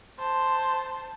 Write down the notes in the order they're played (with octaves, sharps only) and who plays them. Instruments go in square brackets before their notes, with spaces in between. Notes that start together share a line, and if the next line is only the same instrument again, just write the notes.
[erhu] C5 [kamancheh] A5